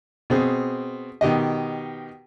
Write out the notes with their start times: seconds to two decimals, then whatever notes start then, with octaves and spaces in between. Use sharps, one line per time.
0.30 B2 C4 G#4
1.21 B2 D#3 G4 D#5